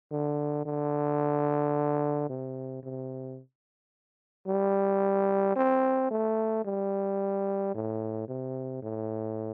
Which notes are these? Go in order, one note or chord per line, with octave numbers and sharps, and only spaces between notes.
D3
D3
C3
C3
G3
C4
A3
G3
A2
C3
A2